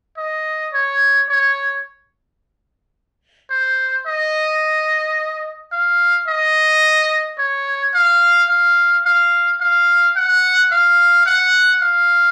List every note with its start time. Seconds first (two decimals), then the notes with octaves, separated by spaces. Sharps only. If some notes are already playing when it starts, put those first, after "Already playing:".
0.17 D#5
0.73 C#5
1.29 C#5
3.50 C5
4.07 D#5
5.72 F5
6.28 D#5
7.38 C#5
7.94 F5
8.49 F5
9.05 F5
9.60 F5
10.16 F#5
10.72 F5
11.26 F#5
11.82 F5